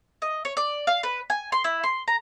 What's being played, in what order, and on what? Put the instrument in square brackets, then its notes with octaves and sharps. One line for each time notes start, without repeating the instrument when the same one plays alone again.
[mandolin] D#5
C#5
D5
F5
B4
G#5
C6
E4
C6
A#5